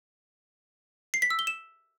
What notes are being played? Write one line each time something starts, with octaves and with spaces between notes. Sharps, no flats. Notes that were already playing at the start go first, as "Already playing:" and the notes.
C7
B6
E6
G7
E7